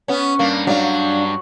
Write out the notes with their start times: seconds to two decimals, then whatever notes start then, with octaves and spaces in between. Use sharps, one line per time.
0.08 B3 C#4
0.39 G2 A#3
0.67 F#3 D4 F5